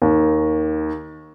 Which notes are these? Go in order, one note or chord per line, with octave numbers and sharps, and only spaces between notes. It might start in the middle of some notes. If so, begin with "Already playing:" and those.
D#2